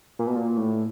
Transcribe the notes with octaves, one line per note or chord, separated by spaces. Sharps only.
A#2
B2
A#2
A2